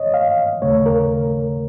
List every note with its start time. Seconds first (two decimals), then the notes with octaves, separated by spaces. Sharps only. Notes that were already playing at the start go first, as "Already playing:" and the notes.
Already playing: C#5 D#5
0.14 F5
0.62 D#2 C#3 A3 C#5
0.86 A#4